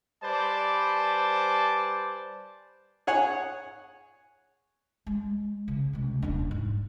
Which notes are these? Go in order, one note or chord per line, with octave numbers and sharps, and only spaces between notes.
G3 B4 C5 D5 G#5 A5
G#4 C#5 F#5 G#5
G#3
C#3
C#2 C3
D#1 D4
G#2